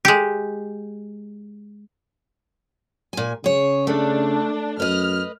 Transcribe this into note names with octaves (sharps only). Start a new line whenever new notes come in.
G#3 G4
A#2 G#5
C#3 G#4 C#5
A3 D4
F#2 B4 D#5 F6